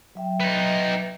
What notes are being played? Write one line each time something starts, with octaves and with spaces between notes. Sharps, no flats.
F#3 E5 G5
B3 D#4